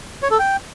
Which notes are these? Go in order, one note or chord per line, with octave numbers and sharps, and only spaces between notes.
C#5
A4
G5